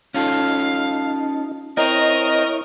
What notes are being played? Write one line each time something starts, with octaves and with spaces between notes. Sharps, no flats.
C#4 D#4 F4 A4 F5
C4 E4 A#4 C#5 D#5 A#5